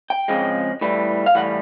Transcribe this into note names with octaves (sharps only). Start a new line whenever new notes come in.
G5
F2 C#3 F3 G#3
A2 E3 G3
F5
A2 E3 G3 F#5